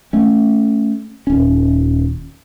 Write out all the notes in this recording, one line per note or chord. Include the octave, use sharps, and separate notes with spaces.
A3 C#4
D#1 C#4